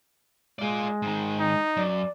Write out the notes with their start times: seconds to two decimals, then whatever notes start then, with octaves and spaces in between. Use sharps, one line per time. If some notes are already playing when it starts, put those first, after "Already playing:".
0.59 G#3 F4 D5
1.02 G#2 D#3
1.39 D#4
1.77 F#2 D5